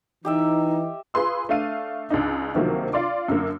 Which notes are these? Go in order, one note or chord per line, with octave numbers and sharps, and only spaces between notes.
E3 D#4 G4 D#5 E5
F4 G#4 B4 C6 E6
A3 D4 F5 D#7
C#2 D4 D#4
D2 C3 D#3 F3 F#3 A#3
F4 D5 C6 D6
F#2 D3 A#3